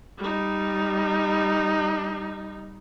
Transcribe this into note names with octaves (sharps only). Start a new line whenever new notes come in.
G3 D#4